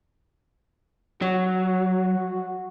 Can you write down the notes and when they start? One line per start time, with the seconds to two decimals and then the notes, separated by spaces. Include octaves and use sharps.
1.22 F#3 F#4